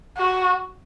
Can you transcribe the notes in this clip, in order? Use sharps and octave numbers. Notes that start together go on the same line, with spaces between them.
F#4